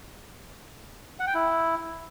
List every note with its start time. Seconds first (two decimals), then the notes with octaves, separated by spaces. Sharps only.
1.20 F#5
1.27 G5
1.34 E4